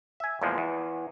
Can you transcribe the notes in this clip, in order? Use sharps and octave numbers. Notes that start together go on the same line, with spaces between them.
E5 G#5
E2 A#2 F3 G#3
E2